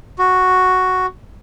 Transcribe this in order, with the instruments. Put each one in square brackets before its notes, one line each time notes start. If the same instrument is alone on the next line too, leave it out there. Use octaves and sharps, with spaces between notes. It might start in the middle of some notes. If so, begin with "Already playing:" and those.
[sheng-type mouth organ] F#4